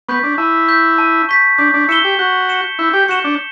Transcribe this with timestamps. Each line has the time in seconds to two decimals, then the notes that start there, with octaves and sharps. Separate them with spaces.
0.08 B3 C#6 G6 B6
0.23 D4
0.38 E4 A5
0.68 C#6 G6 B6
0.98 A5
1.29 C#6 G6 B6
1.58 D4 G6
1.74 D4
1.89 E4 C#7 E7 G7
2.04 G4
2.19 F#4 G6
2.49 C#7 E7 G7
2.79 E4 G6
2.93 G4
3.08 F#4 C#7 E7 G7
3.24 D4